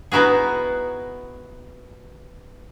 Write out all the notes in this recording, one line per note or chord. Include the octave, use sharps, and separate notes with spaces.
B3 D#4 E4 F#4 G#4